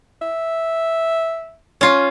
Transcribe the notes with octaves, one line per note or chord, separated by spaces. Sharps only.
E5
C#4 F4